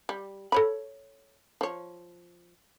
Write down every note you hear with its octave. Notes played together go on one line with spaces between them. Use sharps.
G3
A4 C#5 B5
F3 C#5